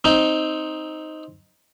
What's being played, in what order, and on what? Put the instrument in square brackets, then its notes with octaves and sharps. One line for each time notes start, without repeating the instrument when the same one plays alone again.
[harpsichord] C4 D#4